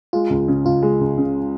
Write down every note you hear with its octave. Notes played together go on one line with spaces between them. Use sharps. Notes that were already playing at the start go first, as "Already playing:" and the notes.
G#3 F4
C#2
C#3
C#2 F4
G#3
C#2
C#3